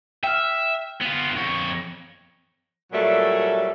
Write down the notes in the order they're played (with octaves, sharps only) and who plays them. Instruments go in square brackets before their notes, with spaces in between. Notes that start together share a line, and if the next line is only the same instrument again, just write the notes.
[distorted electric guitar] E5 [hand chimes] G5 F6
[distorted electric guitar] B3 F4
F2 C#5
[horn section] A#2 F#3 G3 A3 A4